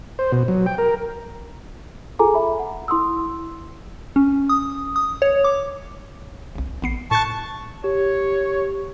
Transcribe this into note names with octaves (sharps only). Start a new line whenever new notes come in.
C5
B2
F#3
G5
A#4
F4 G#4 A4 G#5 A#5 D6
E5 B5
F#5
E4 C6 D#6 E6
C#4
D#6
D#6
C#5
D6
G1 C2
A1 B3 C7
A2 A5 C#6 F#6
G4 C#5